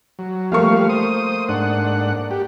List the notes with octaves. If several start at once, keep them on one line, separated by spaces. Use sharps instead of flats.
F#3
F3 G3 A3 A#3 F5 C#6
C5 D#6
G#2 D4 F#5
G4